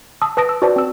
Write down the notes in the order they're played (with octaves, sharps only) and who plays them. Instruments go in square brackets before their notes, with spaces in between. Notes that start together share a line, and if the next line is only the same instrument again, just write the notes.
[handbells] A5 D#6 E6
B4 A5 D#6 A#6 D7
E6
F#4 B4 C5 D5 A5
C4 E6